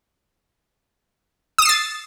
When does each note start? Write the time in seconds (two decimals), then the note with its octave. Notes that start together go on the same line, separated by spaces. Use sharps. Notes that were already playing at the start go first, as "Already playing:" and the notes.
1.58 D#6
1.62 E7
1.65 C7
1.69 A6